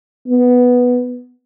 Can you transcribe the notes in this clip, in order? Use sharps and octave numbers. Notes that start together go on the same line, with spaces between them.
B3